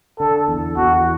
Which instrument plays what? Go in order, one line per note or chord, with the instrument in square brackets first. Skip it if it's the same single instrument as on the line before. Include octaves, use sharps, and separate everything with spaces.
[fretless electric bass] D3 [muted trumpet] A4
[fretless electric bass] E2
[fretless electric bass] E2 [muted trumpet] F#4